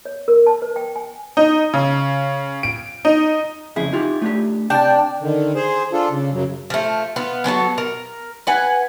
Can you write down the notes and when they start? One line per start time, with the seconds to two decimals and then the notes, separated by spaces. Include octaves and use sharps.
0.05 C#5
0.28 A#4
0.47 A5
0.62 B4
0.76 G5
0.96 G#5
1.37 D#4
1.74 C#3
2.63 D7
3.05 D#4
3.76 F2 C#3 E4 G#4
3.93 D#4 F4 G4
4.22 A3 D4 G4
4.70 C3 D4 G5 A5
5.21 D3 D#3
5.55 G#4 C5
5.93 D4 F4 A4
6.10 C#3
6.32 F#2 C#3 F#3
6.70 F3 A3
7.16 B3 F4
7.44 F#3 B3 A4 A5
7.78 A#4
8.47 B4 F#5 G#5